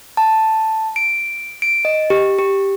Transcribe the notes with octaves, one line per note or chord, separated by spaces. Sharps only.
A5
D7
D7
D#5
G4
G4